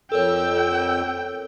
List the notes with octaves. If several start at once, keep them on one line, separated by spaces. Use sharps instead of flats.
F2 A4 A#4 C#5 G5 E6